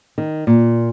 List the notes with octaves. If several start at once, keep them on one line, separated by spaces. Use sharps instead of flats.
D#3
A#2